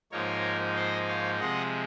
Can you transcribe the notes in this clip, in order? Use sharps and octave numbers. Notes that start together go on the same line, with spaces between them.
G#2 F3 A#3 D#4 A#4 C#5
C5 D#5
C#5 F5
C3 F3 G#3 D#5 F#5